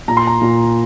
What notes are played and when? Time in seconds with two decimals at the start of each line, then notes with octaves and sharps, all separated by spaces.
0.08 A#2 A#5
0.17 C6
0.27 A#5
0.42 A#2